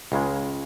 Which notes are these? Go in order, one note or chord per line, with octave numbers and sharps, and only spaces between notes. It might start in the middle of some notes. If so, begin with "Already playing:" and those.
C#2 C#3 G#3